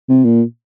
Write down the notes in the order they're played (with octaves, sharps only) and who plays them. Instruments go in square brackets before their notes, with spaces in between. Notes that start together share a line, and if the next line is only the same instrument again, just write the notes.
[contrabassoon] C3
A#2